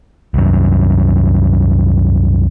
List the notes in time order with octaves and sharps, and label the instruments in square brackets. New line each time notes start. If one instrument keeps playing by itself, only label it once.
[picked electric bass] C2 F#2